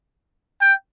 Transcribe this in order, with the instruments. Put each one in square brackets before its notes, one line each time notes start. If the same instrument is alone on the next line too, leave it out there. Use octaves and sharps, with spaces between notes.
[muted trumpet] G5